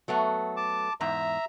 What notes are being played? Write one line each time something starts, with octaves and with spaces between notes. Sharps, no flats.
F#3 A3 B3
A5 D6
E2 G#2 E5 A#5